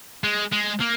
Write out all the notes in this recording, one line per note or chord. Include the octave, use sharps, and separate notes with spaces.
G#3
G#3
A#3